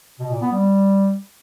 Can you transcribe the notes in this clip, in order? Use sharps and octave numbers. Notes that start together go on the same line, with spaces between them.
B2
A#2
B3
G3